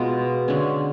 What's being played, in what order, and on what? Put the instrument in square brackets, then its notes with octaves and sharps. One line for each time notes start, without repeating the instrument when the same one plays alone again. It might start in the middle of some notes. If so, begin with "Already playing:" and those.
Already playing: [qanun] B2 G#3 B3 F4
D3 G#3 C#4